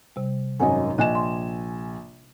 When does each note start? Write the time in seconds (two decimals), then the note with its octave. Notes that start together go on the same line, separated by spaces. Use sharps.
0.16 C3 G3
0.60 G#1 F#2 C#5 D#5 F#5 G#5
0.98 A#1 D#5 G#5 F#6 E7
1.15 C6